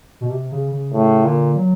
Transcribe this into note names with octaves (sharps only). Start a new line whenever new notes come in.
B2
C3
C#3
C#3
A2 C#3
A#2 D3
F#3